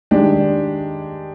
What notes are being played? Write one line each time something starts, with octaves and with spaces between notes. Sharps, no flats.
D#3 G#3 D4 G4